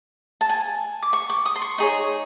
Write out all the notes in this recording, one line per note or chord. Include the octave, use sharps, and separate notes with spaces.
A5
G#5
D6
C#6
D6
D#6
C6
C#6
D#4 G#4 C#5